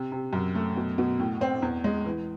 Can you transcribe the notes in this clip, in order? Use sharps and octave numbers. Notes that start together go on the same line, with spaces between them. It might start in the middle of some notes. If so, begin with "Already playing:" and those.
Already playing: C3
C3
F#2
A3
B2
B2
A2
C4
E2
G#3
E3